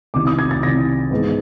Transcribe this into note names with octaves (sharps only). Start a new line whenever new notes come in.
C2 C3 D#3 D6
D#6
G#6
A6
C2 C3 D#3 A#6
G#2 E3 G#3 B3